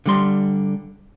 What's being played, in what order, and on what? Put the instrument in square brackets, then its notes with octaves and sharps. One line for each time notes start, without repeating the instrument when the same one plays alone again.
[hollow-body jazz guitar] D3 G3 C6